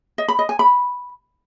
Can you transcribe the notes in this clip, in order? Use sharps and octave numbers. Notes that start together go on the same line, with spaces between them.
D#5
B5
D#5
G#5
B5